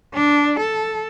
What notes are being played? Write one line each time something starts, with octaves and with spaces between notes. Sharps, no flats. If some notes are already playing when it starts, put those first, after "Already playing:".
D4
A4